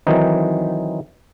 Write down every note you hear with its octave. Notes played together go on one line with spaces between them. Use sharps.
D#3 E3 F#3 C4 D#4